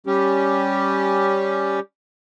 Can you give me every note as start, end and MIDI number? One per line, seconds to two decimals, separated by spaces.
0.06 1.80 55
0.06 1.80 61
0.06 1.80 67